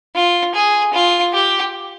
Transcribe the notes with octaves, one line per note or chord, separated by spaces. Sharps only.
F4
G#4
F4
G4